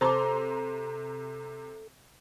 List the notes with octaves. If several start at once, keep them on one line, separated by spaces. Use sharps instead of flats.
C3 A4 C5 A#5 C6 D6